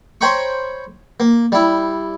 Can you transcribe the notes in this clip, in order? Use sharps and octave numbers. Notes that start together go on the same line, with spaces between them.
C5 C#5 G5 A#5 B5 C#6
A#3
G3 E4